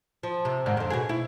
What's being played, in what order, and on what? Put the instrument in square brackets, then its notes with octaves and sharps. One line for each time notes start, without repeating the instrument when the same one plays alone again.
[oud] F3
C3
G#2 D#3 D4
F2 D3
B2 F#4 G#4
E4